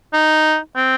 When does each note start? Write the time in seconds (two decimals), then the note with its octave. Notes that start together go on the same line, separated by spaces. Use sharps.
0.13 D#4
0.76 C4